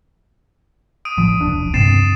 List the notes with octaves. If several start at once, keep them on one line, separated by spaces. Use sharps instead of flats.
D#6 D7 D#7
A1 F3
E1 C2 D4
G2 C3 C4 A6 C7 E7